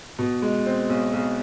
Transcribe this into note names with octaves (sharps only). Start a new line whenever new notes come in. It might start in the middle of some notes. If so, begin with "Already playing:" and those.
B2
G#3
C4
B1
B1